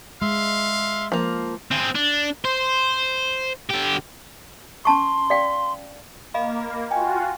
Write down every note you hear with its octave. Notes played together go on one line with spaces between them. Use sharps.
G#3 E5 F5 C6
F3 A#3
C4 G#4
D4
C5
D3 G4
C#4 A5 C6 C#6
D5 F5 G5
A#3 D#5 F5 B5
F4 F#4 G5 G#5